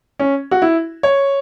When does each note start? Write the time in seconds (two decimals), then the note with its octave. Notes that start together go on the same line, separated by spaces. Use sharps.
0.19 C#4
0.51 F#4
0.62 E4
1.03 C#5